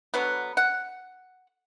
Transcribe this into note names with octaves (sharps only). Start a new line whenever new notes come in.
D3 F#3 B3
F#5